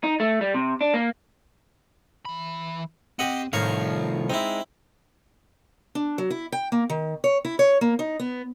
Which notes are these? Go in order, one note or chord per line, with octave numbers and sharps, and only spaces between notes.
D#4
A3
G3
C3
D4
A#3
E3 B5
C4 G4 D#5 F#5
C2 A2 D#3 F3 F5 A#5 C#6
G#3 C4 D#4 E4
D4
F#3
E4
G5
A#3
D#3
C#5
E4
C#5
A#3
D#4
B3